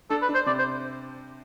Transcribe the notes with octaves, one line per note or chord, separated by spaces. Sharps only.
D4 A4
B4
D4
C5
C3 D5
C5